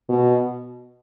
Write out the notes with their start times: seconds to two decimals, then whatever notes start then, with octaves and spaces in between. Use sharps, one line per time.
0.09 B2